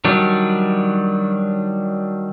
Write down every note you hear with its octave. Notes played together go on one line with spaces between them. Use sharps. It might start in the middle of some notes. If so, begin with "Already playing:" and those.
D#3 F#3 G3 D4